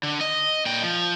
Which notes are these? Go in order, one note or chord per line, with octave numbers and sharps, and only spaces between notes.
D3
D#5
A#2 G5
F3